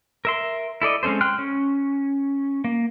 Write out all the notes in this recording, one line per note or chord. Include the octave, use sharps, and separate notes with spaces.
A#4 E5 C6
E4 A4 D5 D#5
G#3 C4 C#4 A4 C5
G5 C6 F6 F#6
C#4
A#3